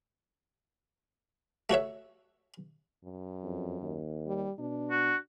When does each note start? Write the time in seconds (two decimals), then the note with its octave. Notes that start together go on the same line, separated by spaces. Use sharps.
1.70 A3 F#4 C#5 E5
3.04 F#2
3.44 F2
3.81 D#2
4.26 G3
4.59 B2 D4
4.91 F#4